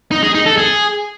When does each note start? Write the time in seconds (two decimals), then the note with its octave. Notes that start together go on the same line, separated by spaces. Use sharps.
0.11 D#4
0.23 G#4
0.34 D#4
0.46 A4
0.58 G#4